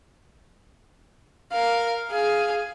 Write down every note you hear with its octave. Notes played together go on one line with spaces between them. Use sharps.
A#4 F5
G#4 F5